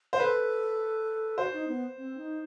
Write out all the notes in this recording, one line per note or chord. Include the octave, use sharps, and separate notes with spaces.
C5
A4 B4
F#4 C5
D#4
B3
C4
D#4